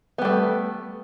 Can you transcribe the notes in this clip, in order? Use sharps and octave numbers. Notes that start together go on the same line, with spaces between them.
G3 A3 B3